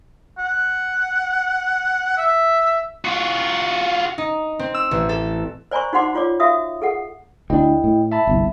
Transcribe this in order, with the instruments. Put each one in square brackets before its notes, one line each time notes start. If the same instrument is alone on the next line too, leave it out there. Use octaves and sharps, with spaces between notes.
[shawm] F#5
E5
[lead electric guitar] F4 F#4
[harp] D#4
C4
E6
A1
A4
[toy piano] C5 D5 G#5 A#5 B5 C#6
D#4 F#4 C5 F#5 C6 D6
F4 C#5 D5 D6
F#4 E5 F5 D#6
G#4 A4 F#5
[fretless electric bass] D2 D4 [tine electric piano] E4 D#5 G5
[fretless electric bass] A2
[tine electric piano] E5 A5 B5
[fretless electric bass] G1 C2